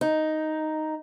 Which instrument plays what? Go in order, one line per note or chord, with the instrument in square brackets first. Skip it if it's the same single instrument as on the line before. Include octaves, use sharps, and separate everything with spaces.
[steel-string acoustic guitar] D#4